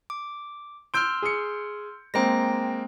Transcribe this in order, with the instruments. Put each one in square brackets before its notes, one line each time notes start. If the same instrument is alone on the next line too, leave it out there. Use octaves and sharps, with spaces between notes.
[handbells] D6
[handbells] C6 E6 F6 [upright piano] G6 D7
[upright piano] G#4 C#7
[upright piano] G#3 A#3 C4 [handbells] G5 A#6